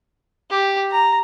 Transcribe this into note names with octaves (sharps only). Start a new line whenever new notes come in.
G4
A#5